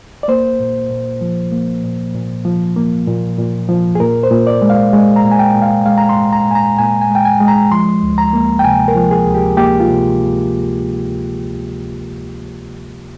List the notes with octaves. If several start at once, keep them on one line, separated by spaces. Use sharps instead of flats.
D5
A#3 C5
A#2
A#2
F3
A#3
A#2
A#2
F3
A#3
A#2
A#2
F3
G#4
A#2 A#4
C5
A#2
D5
G#3
F5
G#3
A#5
A#2
G#5
G5
A#2
F5
G#3 F5
A#5
C6
G#3
A#5
A#2 G#5
A#5
A#2 G#5
G#5
G#3
G5
G#5
G#3
A#5
F3 C6
D2
A#5
A#3
G5
C3 G#5
A#4
F3
G#4
D2
G4
A#3 G4
F4
C3